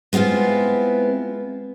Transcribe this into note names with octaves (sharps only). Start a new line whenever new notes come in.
G#3 B3 C4 E4 F4